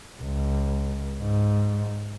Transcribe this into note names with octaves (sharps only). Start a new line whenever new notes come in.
C#2
G#2